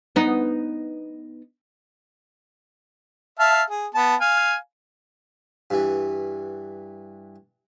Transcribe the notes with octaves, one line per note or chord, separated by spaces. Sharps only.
B3 D#4
E5 F5 A5
G#4
B3 A5
F5 G#5
G2 E3